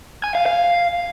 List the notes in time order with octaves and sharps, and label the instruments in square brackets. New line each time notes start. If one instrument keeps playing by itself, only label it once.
[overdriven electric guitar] G#5
F5
F5